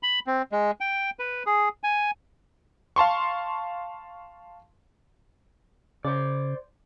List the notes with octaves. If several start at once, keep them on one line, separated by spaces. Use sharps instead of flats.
B5
C4
G#3
G5
B4
G#4
G#5
F5 A5 C6 C#6
C#3 C5 D5